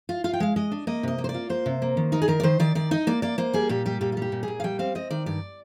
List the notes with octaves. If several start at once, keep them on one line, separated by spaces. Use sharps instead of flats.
F4
F4 F5
G5
G#3 F5
G#3 D#5
D4
A#3 D#5
C3 D#5
A#3
C5
D5
F4
A#3 C5
C3
A#3
D#3
D#4 A#4
G#4
D#3 A#4
D5
D#3 C5
D#3 D5
D#3 D5
D#4 D#5
A#3 D5
A#3 D5
A#3 C5
G3 G#4
A#2 G4
G3 G4
A#2 G4
F4
G3 G4
A#2
A#2 G#4
F5
G3 G5
C4 F5
C4 D#5
D#3 D5
G2 D5